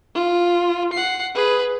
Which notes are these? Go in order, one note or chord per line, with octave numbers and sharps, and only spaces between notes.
F4
F#5 C7
G#4 B4